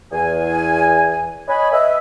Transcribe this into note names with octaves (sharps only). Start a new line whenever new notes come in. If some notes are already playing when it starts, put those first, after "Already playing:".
E2 G#5
C#5 D#5 G#5 B5
B4 D#5 E5